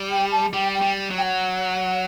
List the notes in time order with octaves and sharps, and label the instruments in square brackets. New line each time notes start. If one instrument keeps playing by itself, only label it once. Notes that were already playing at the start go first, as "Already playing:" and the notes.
Already playing: [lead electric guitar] G3
[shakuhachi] G5
A5
[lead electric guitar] G3 [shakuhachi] G5
[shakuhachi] G5
[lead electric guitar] G3
F#3
[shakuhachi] G5
F#5